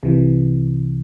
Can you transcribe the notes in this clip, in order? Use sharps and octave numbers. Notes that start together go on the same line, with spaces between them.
C2 C3 E3